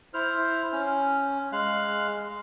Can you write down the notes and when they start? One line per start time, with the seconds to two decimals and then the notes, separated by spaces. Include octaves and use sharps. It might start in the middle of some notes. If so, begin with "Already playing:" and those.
0.14 E4 C5 F6
0.72 C#4
1.52 G#3 F5 F#6